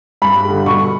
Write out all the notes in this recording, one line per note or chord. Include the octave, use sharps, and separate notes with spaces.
G2 B5
D3 G3
B2 C#6